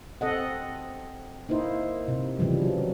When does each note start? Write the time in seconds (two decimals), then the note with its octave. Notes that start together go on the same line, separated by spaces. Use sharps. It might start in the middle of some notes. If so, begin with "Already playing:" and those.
0.21 C4 A4 D#5 F#5
1.49 A#3 D#4 E4 C5
2.08 C3
2.39 C#3 E3 F3 G3
2.62 F#3